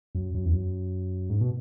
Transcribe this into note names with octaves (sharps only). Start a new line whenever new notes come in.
F#2
F#2
E2
F#2
G#2
B2